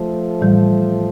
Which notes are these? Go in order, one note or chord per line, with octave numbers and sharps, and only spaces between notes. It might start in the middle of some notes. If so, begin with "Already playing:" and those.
Already playing: F3 A3
A2 E3 G3